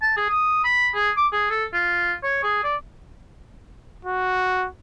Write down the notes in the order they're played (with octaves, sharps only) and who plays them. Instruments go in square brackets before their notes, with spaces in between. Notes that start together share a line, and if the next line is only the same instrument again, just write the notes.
[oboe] A5
G#4
D#6
B5
G#4
D6
G#4
A4
F4
C#5
G#4
D5
[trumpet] F#4